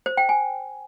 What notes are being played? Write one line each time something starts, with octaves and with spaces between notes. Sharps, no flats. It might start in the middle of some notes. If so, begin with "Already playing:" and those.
C5
G5
G#5